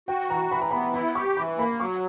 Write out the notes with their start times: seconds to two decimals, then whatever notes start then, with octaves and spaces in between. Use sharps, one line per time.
0.08 F#4 G5
0.30 E3 A#5
0.51 E3 B5
0.62 A#5
0.71 B3 B5
0.94 E4 B5
1.15 G4 C#6
1.37 E3 B5
1.58 A#3 B5
1.80 F#3 C#6